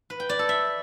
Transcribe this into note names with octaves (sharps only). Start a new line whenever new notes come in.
B4
G5
D5
A4
E5